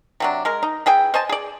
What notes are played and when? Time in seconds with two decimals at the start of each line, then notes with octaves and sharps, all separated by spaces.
0.20 C3 F#3 D4
0.45 G#3 A#4
0.63 D#4
0.86 E3 G#4 G5
1.14 C5 D#5 G#5 A5
1.29 G#4 D5